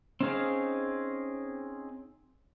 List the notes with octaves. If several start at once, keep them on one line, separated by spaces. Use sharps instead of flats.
C4 C#4 D#4 G#4 F5